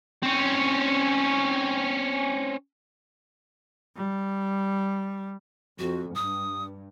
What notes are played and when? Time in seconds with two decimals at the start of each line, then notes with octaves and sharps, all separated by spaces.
0.23 C4 C#4
3.96 G3
5.79 F2 F#4
6.15 G2 D#6